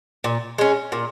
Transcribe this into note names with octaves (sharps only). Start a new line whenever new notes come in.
A#2
G#3 C#4
A#2